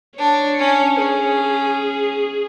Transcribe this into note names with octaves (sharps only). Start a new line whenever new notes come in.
D4 C#5
C#4
C#4 G#4